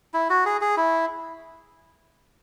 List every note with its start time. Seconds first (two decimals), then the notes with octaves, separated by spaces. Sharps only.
0.14 E4
0.30 F#4
0.46 G#4
0.61 G#4
0.77 E4